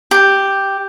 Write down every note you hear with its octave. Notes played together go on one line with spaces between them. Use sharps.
G4